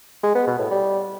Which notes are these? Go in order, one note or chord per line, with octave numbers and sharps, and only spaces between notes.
G#3
B3
B2
A2
G3